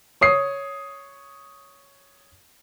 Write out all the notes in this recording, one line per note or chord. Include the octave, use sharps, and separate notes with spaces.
C#5 D#6 C7